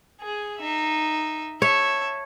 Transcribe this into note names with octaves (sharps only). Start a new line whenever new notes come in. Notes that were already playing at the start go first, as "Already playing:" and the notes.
G#4
D#4 E5
C#5 E5 A5